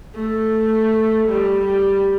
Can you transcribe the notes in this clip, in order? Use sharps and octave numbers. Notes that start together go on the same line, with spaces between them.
A3
G3
G3